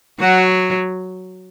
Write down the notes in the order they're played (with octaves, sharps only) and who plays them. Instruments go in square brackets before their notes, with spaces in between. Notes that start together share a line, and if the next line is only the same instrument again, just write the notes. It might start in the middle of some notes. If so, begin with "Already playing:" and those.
[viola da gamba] F#3 [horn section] F#4